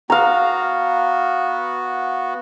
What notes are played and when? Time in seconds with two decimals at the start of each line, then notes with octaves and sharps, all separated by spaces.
0.10 B3 F#4 F5 A#5